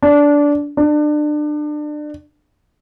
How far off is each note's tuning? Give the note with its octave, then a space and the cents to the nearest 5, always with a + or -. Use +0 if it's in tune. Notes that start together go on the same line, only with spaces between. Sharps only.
D4 -15
D4 +30